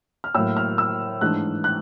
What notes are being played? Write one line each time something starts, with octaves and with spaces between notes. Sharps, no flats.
F6
A2 F#3 A#3 E6
F6
E6
G#2 E3 A3 D4 F#6
F#6